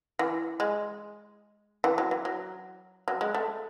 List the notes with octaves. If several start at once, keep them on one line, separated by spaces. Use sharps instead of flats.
E3
G#3
E3
F#3
E3
F#3
F#3
G#3
A3